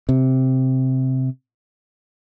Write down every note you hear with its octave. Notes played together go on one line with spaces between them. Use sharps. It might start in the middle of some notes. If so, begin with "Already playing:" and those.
C3